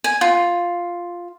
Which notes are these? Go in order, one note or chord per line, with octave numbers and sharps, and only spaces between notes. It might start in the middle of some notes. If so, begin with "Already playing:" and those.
G#5
F4